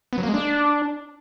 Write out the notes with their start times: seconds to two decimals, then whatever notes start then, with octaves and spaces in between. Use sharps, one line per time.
0.13 B3
0.18 F#3
0.23 A#3
0.29 G#3
0.34 D4